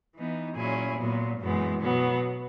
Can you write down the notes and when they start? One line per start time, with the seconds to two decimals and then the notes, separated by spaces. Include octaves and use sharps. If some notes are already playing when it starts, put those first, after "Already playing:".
0.15 E3 B3 D#4
0.56 A#2 F#3 C#4 E4 G#4
0.98 A#2 F#3 B3
1.41 F#2 E3 G#3 B3
1.82 B2 F#3 B3